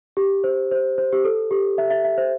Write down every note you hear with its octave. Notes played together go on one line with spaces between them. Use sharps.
G4
C5
C5
C5
G4
A4
G4
E5
E5
E5
C5